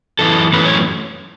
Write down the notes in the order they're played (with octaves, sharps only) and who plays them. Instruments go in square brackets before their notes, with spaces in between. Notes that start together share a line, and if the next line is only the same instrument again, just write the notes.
[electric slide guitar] F#2 E3 B3 A4
F#2 E3 A3 C#4 B4
C#5